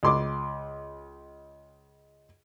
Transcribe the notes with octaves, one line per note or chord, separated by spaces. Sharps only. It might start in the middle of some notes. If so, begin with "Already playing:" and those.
C#2 C6 D6